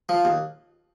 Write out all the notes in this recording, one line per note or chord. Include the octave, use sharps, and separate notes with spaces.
F3
D#2